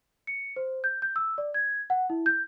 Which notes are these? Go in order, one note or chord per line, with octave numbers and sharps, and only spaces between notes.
C#7
C5
G6
G6
E6
D5
G#6
F#5
E4
G6